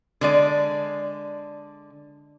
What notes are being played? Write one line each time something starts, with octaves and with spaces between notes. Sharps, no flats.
D3 G#3 D5